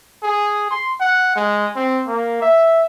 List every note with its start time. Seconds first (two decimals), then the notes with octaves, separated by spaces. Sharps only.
0.23 G#4
0.71 C6
1.01 F#5
1.36 G#3
1.75 C4
2.07 A#3
2.42 E5